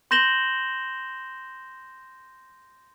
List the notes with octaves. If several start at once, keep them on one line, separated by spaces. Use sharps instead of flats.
C6 G6 A#6 E7 F#7 G7